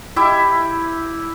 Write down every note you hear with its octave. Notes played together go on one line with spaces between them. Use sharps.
E4 G4 E5